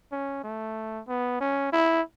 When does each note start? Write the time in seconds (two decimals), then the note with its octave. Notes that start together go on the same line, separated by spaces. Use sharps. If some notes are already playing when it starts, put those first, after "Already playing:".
0.12 C#4
0.44 A3
1.08 B3
1.40 C#4
1.72 E4